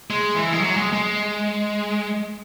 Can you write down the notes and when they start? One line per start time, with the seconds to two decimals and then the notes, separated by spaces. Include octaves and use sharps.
0.10 G#3
0.35 E3
0.53 G#3
0.60 F#3
0.77 G#3
0.93 G#3